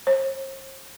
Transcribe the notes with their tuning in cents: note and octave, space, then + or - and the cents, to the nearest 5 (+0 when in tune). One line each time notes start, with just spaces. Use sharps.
C5 +40